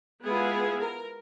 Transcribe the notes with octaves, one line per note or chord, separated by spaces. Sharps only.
G#3 B3 E4 F4 G#4
A#4